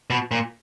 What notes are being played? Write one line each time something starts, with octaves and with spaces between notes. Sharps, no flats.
B2
A#2